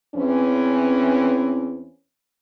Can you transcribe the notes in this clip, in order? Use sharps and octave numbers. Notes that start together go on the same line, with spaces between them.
E2 E3 C4 C#4